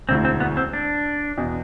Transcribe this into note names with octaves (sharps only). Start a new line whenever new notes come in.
E1 D2 D3 A3 C4 E4
C4
B3
C4
D4
E2 B2